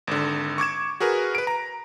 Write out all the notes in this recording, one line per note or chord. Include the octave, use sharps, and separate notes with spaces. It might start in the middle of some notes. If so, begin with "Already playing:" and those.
G#1 D3
C#6 D6 G#6 E7
F#4 G#4 A#4 B4
B4 D7
A#5